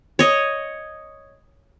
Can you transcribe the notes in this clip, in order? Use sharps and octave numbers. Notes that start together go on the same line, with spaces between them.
C#5 D#5